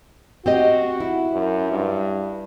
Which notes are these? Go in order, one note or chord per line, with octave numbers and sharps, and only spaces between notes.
C4 F#4 G4 D#5
E4
F#2
G2